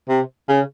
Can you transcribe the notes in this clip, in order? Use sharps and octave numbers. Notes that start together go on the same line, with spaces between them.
C3
C#3